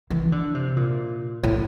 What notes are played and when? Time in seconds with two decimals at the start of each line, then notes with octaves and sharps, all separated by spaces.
0.10 E3
0.32 D3
0.55 C3
0.76 A#2
1.44 A2